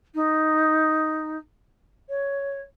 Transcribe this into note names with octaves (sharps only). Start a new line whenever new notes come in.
D#4
C#5